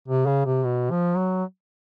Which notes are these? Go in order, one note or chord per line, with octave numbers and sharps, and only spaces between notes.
C3
C#3
C3
B2
F3
F#3